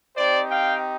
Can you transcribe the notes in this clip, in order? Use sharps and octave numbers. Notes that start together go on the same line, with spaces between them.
C4 D#4 G4 C5 D5
F5 G5